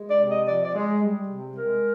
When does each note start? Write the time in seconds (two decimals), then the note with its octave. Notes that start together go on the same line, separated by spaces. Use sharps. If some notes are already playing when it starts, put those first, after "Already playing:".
Already playing: G#3
0.10 D5
0.19 C3
0.28 D#5
0.46 F3 D5
0.65 D5
0.73 G#3
1.01 G3
1.29 C3
1.56 G#3 A#4